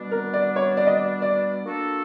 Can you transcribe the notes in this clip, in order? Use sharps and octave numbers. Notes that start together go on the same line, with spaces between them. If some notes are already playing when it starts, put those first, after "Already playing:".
Already playing: B2 G3 B3 D4
A#4
D5
C#5
D5
D#5
D5
D5
A#3 D4 F#4 A4